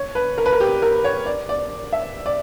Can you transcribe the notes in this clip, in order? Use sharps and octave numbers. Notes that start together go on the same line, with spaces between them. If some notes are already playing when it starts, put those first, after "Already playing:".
Already playing: C#5
B4
A#4
B4
A#4
G4
A#4
C#5
D5
D5
E5
D5